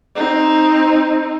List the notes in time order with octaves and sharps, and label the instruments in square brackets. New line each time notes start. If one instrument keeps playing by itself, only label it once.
[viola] C4 D#4